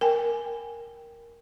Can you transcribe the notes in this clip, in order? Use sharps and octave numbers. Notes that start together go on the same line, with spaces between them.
A#4 G5 G#5